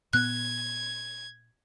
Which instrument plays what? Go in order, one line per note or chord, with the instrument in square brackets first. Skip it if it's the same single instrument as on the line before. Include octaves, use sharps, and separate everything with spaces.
[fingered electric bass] A#2 B3 [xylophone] F#6 [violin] G#6